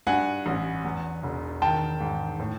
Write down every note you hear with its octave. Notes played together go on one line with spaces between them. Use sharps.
G2 F#5 G#5
A1
E2
E1
D#3 G5 A5
G#2
A2